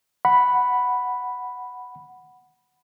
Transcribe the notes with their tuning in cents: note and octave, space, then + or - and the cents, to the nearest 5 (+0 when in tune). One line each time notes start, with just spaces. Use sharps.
F#5 +0 B5 +0